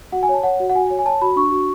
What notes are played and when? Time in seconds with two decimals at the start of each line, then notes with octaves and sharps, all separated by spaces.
0.12 F#4 F#5
0.23 G#5
0.29 C#5 A5
0.43 C#5 F#5
0.60 F#4
0.69 F#5
0.75 F#4 G#5
0.90 C#5
0.99 G#5
1.06 C#5 A5
1.22 F#4 B5
1.36 D4 C#6
1.52 F#4